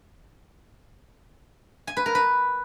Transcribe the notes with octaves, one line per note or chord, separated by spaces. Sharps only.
G#5
B4
A#4
B4